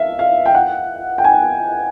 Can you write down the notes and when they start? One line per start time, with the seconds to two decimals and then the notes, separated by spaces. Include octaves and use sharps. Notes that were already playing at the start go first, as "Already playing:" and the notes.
Already playing: E5 F5
0.19 F5
0.46 G5
0.55 F#5
1.18 G5
1.24 G#5